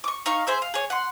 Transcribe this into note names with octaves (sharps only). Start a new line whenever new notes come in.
C#6 D6
D#4 F5 C#6
G#4 C5 E5
F5
G#4 C#5
F#5 C6